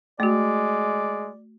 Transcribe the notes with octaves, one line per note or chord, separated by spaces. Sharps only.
G#3 A3 F#4 D5